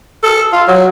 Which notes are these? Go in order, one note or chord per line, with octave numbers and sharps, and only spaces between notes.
A4
F4
F#3